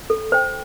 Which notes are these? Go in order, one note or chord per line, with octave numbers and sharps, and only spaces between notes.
A4
C5 G5